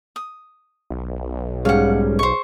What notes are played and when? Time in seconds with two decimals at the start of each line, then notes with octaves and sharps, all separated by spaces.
0.16 D#6
0.90 B1
1.65 G#2 G3 C#4 G#4 F5 F#5
2.19 C5 C#6